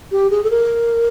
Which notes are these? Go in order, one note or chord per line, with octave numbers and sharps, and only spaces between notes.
G4
G#4
A4
A#4